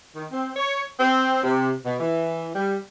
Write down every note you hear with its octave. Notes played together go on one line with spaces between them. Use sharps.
D#3
C4
C#5
C4
C3
B2
E3
G3